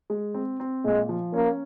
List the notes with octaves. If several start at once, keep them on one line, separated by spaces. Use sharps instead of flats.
G#3
C4
C4
A#2 G#3
F3
A#3 C#4